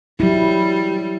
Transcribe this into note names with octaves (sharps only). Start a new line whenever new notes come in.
F#3 G3 E4